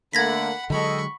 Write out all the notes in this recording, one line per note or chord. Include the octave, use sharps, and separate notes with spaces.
D3 A3 A#3 F#5 B5 G#6 A#6 B6
D3 F#3 G#3 A4 D#5 G5 B5 C#6